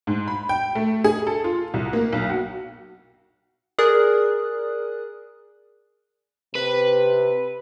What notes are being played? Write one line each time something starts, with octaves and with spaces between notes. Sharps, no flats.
G#2
B5
G5
A3
G#4
A4
F4
C2
A#3
B1
F#4
G#4 A#4 D5 D#6 F#6
C3 B4